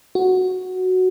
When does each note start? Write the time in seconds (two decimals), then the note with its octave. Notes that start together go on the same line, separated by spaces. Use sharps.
0.15 F#4